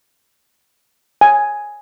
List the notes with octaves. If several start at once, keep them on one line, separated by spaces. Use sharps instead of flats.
G#5